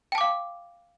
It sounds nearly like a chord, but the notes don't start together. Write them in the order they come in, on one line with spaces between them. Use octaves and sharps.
G5 A5 D6 F5